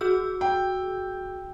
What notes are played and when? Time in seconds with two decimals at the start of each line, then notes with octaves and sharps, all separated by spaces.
0.01 F#4 G#4 E6
0.41 G5